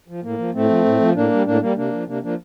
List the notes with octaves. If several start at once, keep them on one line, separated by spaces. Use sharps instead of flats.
F3
A2 A#3
F3
A2 A3 C4
F3
A2
F3
A2 A#3 D4
G3
A2 A#3 D4
G3 A#3
C3 A#3 D4
F3
C3 A#3 D4
F3 A#3 D4